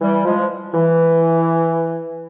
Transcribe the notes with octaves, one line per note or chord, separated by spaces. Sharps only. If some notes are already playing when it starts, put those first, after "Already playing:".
E3 G3
F3 G#3
E3